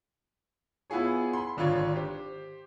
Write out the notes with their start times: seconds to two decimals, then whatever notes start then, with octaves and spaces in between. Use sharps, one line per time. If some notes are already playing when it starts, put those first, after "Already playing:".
0.90 B3 E4 F4 G#4 C#5
1.33 B5 C6
1.57 G#1 D3 F4 C#5 D5
1.96 G4 C5